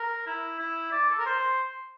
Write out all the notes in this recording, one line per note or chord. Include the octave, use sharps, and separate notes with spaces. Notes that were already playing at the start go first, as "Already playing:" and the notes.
Already playing: A#4
E4
E4
D5
A4
A#4
C5